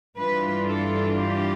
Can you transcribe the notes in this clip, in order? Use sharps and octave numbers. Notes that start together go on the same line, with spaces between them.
G2 E3 G3 D4 F4 B4
A4
G4